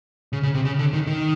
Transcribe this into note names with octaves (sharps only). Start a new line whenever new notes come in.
C#3
C#3
C3
C#3
D3
D#3
D#3